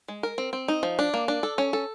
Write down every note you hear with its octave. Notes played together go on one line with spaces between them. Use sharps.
G#3
A#4
C4
C4
D#4
F3
D4
A#3
D4
A4
C#4
A4